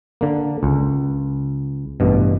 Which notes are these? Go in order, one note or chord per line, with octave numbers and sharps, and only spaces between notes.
D3 A#3
C#2
A1 G2 B2